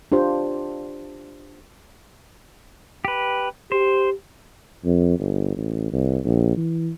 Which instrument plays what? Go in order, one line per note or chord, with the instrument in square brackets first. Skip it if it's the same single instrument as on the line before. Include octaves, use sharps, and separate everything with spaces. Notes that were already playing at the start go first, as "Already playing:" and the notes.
[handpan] D4 F4 G4 C5
[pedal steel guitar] G4 B4
[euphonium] G4 [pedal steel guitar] C5
[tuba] F2
G1
A1
C2
A#1
E3